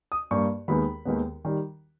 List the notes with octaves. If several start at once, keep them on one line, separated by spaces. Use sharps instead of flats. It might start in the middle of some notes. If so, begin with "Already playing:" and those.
D#6
G2 G3 A#3 C#6
D#2 D#3 G#3 B3 B5
D#2 D#3 G#3 B3
D#3 G3